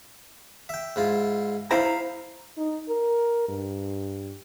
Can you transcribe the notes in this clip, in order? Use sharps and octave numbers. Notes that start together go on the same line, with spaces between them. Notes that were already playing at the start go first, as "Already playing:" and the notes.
E5 G5
G#2 E4 F4
E4 C5 F5 A#5 B5
D#4
A#4
G2